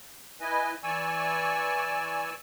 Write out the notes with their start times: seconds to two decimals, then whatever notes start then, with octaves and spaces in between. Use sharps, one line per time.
0.41 E4 B4 D#5 G#5
0.83 E3 D5 G#5 C#6 E6